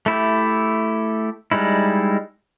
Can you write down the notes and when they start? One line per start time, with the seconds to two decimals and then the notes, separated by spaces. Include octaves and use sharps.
0.06 A3 E4 G4
1.52 G3 G#3 D#4 E4